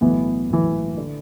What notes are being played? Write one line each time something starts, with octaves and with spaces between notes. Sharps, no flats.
B1 A2 E3 B3
B1 A2 E3
D3